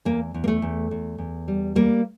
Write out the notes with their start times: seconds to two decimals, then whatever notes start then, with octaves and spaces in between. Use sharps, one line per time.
0.05 E2 A#3
0.34 E2
0.44 A#3
0.48 A3
0.62 E2
0.91 E2
1.18 E2
1.48 G3
1.76 G3 A#3